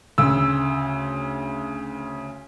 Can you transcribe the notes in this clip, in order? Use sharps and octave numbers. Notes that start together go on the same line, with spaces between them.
D2 C#3 E6